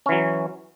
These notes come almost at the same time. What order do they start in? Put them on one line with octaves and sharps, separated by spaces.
C#4 E3 F#3